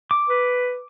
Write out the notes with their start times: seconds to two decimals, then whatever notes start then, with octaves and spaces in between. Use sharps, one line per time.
0.11 D6
0.29 B4